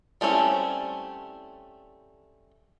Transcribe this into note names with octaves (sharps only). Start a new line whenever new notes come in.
G3 A3 C4 C#4 E4